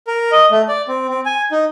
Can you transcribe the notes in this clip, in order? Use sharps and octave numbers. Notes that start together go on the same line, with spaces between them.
A#4
D#5
A3
D5
C4
C4
G#5
D#4